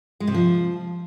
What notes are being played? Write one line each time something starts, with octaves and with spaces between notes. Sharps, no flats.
G#3
C3
F3